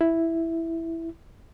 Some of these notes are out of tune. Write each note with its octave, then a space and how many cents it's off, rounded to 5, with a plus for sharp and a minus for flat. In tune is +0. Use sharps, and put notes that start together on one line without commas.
E4 +0